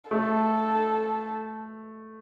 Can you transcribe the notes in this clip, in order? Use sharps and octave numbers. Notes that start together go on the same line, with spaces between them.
A3 A4